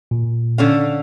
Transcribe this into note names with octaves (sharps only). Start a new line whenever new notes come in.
A#2
D3 C#4 F5